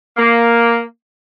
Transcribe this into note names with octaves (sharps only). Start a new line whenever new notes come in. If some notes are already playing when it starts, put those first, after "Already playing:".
A#3